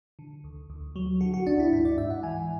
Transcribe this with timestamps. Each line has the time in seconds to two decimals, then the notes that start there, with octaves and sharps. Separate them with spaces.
0.19 D3
0.44 D2
0.70 D2
0.96 F#3
1.21 D3 F#4
1.34 F#4
1.47 D2 D4
1.60 E4
1.72 G#2 E4
1.85 D5
1.98 G#2 E5
2.10 F#5
2.23 E3 G#5